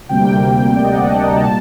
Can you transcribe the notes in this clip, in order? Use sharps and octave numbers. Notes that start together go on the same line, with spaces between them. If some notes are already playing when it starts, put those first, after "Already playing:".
D2 C3 G3 A#3 G5
D5
D#5
F#5
G5
A5
A#5
A#2 G3 A#3 A5